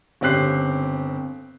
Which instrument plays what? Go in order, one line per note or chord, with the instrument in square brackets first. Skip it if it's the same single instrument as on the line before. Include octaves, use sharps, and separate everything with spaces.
[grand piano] G1 C#3 C4 G4 F#6 C7